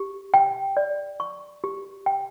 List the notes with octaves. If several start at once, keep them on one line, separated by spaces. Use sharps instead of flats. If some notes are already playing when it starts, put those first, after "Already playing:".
Already playing: G4
G5
D5
C#6
G4
G5